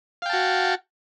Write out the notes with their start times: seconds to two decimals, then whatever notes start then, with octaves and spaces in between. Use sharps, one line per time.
0.22 F5
0.26 G5
0.30 A5
0.33 F#4